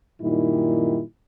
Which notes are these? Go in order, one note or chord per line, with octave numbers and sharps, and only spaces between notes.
F#2 A#2 D#3 G3 D#4 E4